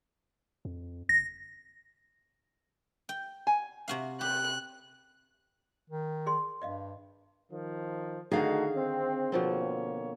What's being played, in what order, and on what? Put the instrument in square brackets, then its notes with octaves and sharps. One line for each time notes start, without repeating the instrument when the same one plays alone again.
[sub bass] F2
[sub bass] F#1 [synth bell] A#6
[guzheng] G5
[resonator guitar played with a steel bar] G#5
[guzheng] C3 F#4 F5
[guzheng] G4 [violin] F#6
[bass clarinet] D#3
[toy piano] G#4 D5 C6
[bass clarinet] G2 [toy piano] D5 D#5 F5
[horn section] D#3 F3
[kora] D3 D#3 [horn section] A3 D#4 F#4 [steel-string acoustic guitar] G#4 F5
[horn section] C4
[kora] B2 F3 C4 [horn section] D3 A#3 C#5